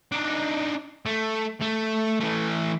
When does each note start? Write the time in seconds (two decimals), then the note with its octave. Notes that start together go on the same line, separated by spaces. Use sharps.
0.12 D4 D#4
1.06 A3
1.61 A3
2.21 E3 A3